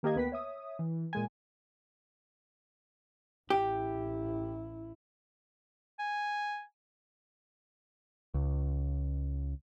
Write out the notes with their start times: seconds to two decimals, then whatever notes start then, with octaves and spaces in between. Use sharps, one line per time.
0.03 D#3 A#3 G4 D#5 G#6
0.15 D2 B3 B4 G5 B6
0.32 C#5 E5 D#6
0.79 E3
1.13 A#2 G#3 G#5
3.50 A1 E4 G4
5.99 G#5
8.34 C#2